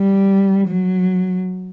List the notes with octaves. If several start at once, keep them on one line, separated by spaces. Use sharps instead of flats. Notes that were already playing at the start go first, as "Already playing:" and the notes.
Already playing: G3
F#3